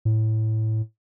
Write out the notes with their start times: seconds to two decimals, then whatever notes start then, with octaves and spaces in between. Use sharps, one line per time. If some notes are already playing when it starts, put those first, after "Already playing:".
0.05 A2